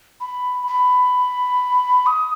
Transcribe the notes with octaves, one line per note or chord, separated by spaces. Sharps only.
B5
B5
D#6